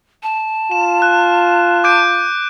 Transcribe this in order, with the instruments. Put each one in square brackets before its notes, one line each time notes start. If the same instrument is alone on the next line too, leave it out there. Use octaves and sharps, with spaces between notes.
[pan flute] A5
[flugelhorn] F4 [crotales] E7
[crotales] F#6
D6 G6 D7